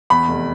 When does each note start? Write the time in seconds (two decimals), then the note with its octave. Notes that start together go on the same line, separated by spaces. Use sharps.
0.10 E2 B5
0.28 F1